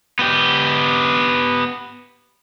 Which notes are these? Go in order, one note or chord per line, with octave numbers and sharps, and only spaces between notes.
B3 G4